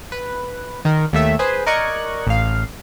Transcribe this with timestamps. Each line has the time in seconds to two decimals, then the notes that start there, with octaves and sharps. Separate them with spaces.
0.12 B4
0.85 D#3 A#4
1.13 D#2 A3 E5
1.39 G#4 B4 C5
1.66 A#4 D5 D#5 C#6 F#6 G#6
2.27 A1 F5